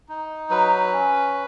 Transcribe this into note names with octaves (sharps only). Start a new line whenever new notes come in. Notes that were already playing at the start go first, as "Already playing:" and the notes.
D#4
F#3 B4
C#4